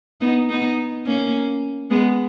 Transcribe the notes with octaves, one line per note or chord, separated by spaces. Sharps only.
B3 D#4
B3 D#4
A#3 C#4
G#3 B3